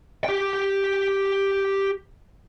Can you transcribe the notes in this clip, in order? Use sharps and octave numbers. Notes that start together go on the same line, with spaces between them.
G4 G5